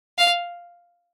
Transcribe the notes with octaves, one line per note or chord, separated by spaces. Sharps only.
F5